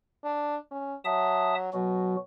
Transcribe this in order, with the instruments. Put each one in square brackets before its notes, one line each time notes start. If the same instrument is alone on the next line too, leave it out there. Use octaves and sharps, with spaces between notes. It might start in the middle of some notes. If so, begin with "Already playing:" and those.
[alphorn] D4
C#4
[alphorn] F#3 [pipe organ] E5 A5 D#6
[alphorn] B2 [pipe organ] F#3 F#4